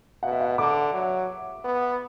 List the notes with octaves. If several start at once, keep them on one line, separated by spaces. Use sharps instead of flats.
B2 F#5
E5
F#5
D3 D6
F#3
B3